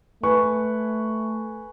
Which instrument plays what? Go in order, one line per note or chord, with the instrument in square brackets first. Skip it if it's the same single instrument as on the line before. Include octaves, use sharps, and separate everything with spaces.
[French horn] A3 [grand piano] B4 G#5 C#6